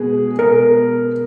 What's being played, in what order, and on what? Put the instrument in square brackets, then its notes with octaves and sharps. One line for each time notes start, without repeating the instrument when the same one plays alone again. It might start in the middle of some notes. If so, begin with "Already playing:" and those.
Already playing: [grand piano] B2 G#3 B3 [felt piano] G#4
[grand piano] B2 G#3 B3 [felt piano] A#4